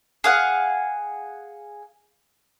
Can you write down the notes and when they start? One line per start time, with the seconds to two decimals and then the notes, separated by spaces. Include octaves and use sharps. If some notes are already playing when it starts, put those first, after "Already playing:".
0.24 G#4 F5 F#5